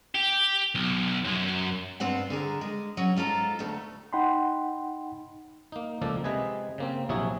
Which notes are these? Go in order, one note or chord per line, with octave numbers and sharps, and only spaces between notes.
G4
B1
F#2
G2 C4 F4 F#5
D3 G#4 A#4
G#3
F#3 C#4
G#2 F4 A4 A#5
D2 A3
D#4 F#5 G5 B5 C6
A#3 D#4
C#2 F3 A#3 A4 D5
C3 G#3 B4 D#5 G#5
C#3 A#3 C4
A#1 C3 F#3 E4 F#4 G#4